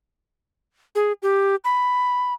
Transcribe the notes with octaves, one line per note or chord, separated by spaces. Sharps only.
G#4
G4
B5